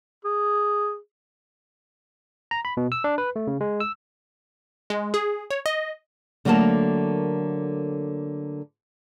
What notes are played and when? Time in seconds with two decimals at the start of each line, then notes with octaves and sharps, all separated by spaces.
0.24 G#4
2.51 A#5
2.65 B5
2.77 B2
2.92 E6
3.04 D4
3.18 B4
3.36 A3
3.47 C#3
3.61 G#3
3.80 E6
4.90 G#3
5.14 G#4
5.51 C#5
5.66 D#5
6.45 D3 F#3 A3 A#3 A#4 A5